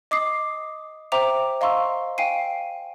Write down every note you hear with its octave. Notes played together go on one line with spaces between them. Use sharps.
D#5 D6 D#6 C7
C5 E5 G5 A#5 D6 F7
D#5 F5 A#5 C6 C#6 E6
F5 G5 G#5 C7 D#7